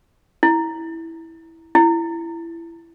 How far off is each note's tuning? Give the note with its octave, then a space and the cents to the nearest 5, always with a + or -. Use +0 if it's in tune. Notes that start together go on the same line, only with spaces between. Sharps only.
E4 -10
E4 +20